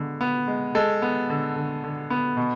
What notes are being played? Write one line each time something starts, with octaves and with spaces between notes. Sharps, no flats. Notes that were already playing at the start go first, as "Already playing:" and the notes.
Already playing: D3 G#3 B3
B3
G#3
G#3 A4
B3
D3
D3
D3
B3
B2